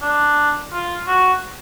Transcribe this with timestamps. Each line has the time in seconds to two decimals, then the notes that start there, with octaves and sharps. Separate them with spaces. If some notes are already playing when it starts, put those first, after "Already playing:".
0.02 D4
0.73 F4
1.07 F#4